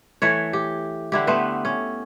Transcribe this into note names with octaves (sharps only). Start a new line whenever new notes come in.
E3 A3 C#5
G4
D3 E4 G4
A3 B3 B4 C5
C#4